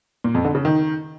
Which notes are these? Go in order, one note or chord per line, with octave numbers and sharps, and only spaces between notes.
A#2
F2
D3
C#3
D#3